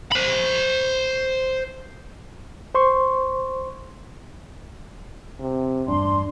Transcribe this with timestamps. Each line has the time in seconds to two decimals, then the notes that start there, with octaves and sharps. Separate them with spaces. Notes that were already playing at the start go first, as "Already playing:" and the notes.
0.12 C5 B5
2.75 C5 C6 C#6
5.40 C3
5.88 E2 G2 A3 D4 C6